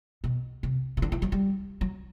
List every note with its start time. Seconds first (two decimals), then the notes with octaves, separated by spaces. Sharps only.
0.24 B2
0.63 C3
0.97 C3
1.02 D3
1.12 E3
1.22 F#3
1.32 G3
1.81 F#3